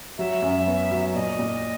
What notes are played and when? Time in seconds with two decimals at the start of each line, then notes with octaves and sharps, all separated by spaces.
0.18 F#3 E5
0.42 F#2
0.67 B3
0.91 F#3
1.14 A#2 D#5
1.39 A#2